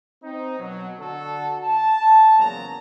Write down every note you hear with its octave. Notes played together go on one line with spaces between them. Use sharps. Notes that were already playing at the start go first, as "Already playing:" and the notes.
C4 D#4
B2 F#3
D3 F#4 A4
A5
E2 A#2 C#3 F3 F#3 A#5